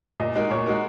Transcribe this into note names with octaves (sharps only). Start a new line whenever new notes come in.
A#2 D#5
G#3 D#4 F#4 A#4
A#2 C#5
G#3 D#4 F#4 A#4